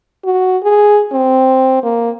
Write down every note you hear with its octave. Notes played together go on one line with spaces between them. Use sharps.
F#4
G#4
C4
A#3